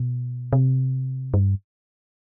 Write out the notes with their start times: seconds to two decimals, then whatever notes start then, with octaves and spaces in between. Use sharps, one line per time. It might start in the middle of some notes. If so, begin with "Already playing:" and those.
Already playing: B2
0.53 C3
1.34 G2